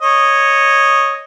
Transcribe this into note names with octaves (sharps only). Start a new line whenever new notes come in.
C#5 D#5